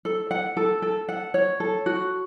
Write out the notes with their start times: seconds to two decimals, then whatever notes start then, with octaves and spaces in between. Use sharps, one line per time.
0.05 A4
0.31 F#5
0.57 A4
0.82 A4
1.09 F#5
1.34 C#5
1.60 A4
1.86 F#4